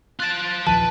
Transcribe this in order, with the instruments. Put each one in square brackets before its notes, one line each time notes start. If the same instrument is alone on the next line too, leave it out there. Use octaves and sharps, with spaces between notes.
[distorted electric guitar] F4 A5 [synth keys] F#6 A6 D7
[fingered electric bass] A#1 D#2 F3 [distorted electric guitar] B4 [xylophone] A5